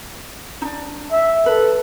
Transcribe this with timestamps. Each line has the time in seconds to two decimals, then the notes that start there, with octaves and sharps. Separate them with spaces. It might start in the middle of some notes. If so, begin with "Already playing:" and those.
0.62 D4 D#4
1.12 E5
1.46 A4 B4